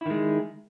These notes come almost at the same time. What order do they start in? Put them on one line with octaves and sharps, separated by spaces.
E4 D#3 G#3